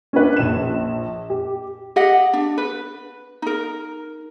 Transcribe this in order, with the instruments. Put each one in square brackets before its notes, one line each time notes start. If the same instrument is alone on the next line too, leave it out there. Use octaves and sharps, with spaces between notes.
[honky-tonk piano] C#4 D4 B4
A#1 E7
G4
[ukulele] G4 D#5 F#5
D4
B4
D#4 A#4